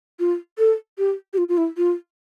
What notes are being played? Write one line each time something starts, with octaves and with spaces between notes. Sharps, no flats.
F4
A4
G4
G4
F4
F4
E4
F4